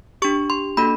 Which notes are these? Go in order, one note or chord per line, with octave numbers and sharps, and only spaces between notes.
D4 G4 C#6
C6
A#3 D4 F#4 A4 B5